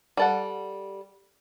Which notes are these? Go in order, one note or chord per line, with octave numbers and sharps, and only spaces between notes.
G3 A4 F#5